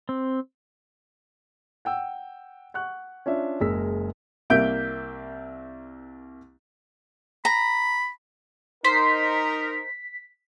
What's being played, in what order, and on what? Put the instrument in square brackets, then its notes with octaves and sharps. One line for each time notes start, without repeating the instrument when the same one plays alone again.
[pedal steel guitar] C4
[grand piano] F#5 G5 E6
F#5 C#6 F#6
C#4 D4 F4 E5
F#1 G#3 A#4 E6 B6
[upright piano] C2 A#3 E5 G6 D7
[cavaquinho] A#5 [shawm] B5
[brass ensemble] D#4 A#4 [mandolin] C5 [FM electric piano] B6